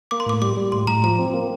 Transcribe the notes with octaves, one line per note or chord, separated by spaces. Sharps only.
A#3 D6
C6
A2 D6
G3 D6
G3
A2 C6
A2 A#5
F3 A#5
C4
A#3